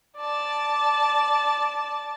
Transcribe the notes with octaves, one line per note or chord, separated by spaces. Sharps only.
D5 A5